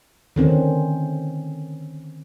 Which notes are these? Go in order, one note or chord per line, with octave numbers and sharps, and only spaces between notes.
D3 D#3 C4 C#4